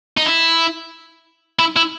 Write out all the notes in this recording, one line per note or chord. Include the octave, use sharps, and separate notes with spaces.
D#4
E4
E4
E4